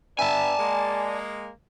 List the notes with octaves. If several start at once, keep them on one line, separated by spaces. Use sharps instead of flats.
G2 B3 D5 E5 G#5 A5
G#3 A#3